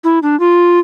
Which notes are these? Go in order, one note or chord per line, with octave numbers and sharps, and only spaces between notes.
E4
D4
F4